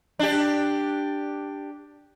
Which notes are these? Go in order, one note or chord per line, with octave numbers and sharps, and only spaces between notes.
D4 G4